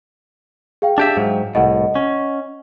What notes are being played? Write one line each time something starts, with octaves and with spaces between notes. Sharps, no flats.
G#4 F5 G5
D4 G4 E5
G#2 F#3
C2 A2 D#5 F#5
C#4